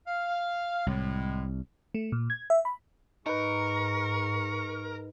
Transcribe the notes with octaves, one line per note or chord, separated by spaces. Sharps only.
F5
C2 A2 G#3
A3
A#2
G#6
E5
B5
G#2 D#4 A#4 B4 C#6